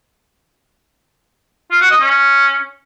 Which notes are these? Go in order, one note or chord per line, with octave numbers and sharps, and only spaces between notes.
F4
F#4
D#5
C#4